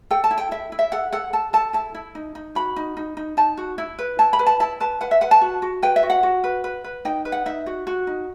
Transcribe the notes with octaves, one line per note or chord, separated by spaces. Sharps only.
A4 G5
A5
E4
G5
E4 E5
E4
E5
A4 F#5
A4 F#5
A4 A5
A4 A5
E4 A5
E4
D#4
D#4
F#4 B5
D#4
D#4
D#4
D#4 A5
F#4
E4
B4
E4 A5
B5
B4
A5
E4 A5
B4 A5
B4 F#5
E5
B4 F#5
A5
F#4
F#4
B4 G5
E5
F#4
F#5
F#4
B4
B4
B4
D#4 G5
B4
F#5
D#4 E5
F#4
F#4
D#4